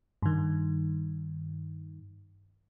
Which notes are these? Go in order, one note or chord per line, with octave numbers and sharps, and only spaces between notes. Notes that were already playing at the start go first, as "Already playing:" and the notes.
G2 D#3